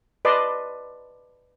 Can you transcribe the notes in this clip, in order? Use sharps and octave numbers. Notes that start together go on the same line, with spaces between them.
B4 D5 D#5 A5 C6